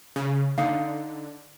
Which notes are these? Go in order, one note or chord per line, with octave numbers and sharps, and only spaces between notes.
C#3
D3 D#4 F5